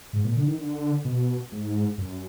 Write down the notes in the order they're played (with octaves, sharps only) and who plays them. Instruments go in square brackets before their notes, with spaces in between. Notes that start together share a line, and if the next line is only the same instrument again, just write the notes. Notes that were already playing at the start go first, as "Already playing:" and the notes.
[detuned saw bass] G#2
A#2
D3
D#3
D3
B2
G#2
F#2